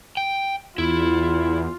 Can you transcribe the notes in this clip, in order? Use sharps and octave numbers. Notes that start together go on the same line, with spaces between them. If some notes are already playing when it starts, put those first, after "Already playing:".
G5
E2 E4 F4